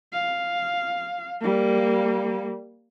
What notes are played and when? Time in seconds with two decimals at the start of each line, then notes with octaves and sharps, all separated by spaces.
0.13 F5
1.41 G3 A#3